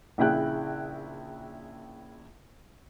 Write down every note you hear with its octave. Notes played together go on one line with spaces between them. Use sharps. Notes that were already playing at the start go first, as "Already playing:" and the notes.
A#1 C#3 E4 G#4 G5 F#6